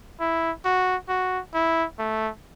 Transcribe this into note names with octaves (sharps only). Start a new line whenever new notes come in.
E4
F#4
F#4
E4
A3